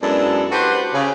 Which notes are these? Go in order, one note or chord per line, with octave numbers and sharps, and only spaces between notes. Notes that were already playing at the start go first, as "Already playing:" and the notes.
F#2 G#3 B3 D4 E4 A4
D4 F#4 G4 B4 C5
C#3